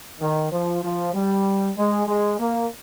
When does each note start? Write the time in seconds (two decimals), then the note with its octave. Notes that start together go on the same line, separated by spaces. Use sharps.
0.20 D#3
0.52 F3
0.83 F3
1.14 G3
1.77 G#3
2.07 G#3
2.39 A#3